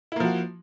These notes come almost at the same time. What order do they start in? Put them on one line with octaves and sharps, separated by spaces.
E4 A#3 F3 F#4